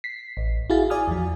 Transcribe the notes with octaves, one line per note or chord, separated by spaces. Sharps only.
B6 C7
A1
E4 F#4 G#4 F5 A6
D5 G#5 D#6 F6
E2 F3